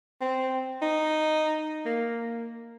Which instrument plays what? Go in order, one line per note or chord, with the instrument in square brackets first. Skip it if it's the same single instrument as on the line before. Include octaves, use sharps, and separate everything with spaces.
[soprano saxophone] C4
D#4
A#3